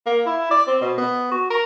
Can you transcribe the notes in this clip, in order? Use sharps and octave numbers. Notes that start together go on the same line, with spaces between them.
A#3
E4
D5
C4
B2
B3
F#4
A#4